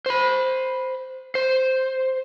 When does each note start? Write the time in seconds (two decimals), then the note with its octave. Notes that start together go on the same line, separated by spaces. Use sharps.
0.06 C5 B5
1.35 C5